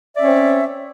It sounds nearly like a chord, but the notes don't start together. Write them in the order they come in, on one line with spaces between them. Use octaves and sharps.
E5 D5 C#4 C#5 C4